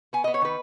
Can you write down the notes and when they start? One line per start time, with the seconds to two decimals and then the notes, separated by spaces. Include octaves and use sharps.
0.13 B3 G#5
0.24 B3 D#5
0.34 C#5
0.41 D#3 B4